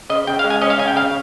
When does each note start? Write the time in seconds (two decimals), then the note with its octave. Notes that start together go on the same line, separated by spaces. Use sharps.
0.10 C#3 D#5
0.27 C#3 G5
0.39 F5
0.44 G#3
0.50 G#5
0.62 C#4 D#5
0.70 F5
0.78 C#3 G#5
0.88 G5
0.96 C#3 F5